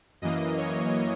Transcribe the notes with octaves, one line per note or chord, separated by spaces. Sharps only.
F#2 E3 A#3 D#5
C#5